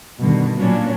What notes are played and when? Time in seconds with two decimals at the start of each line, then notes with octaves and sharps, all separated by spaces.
0.20 G2 B2 D3 D#3
0.56 A#2 F#3 A#3 B3 C#4 D4